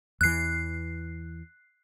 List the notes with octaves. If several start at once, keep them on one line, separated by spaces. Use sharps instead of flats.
E2 E3 F#6 C7